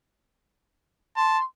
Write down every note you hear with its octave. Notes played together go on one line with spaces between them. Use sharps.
A5 C6